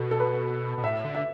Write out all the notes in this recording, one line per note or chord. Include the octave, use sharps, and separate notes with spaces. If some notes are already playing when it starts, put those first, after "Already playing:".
Already playing: B2 F#4 A4
A4
B4
B2
A2 E5
D3
E5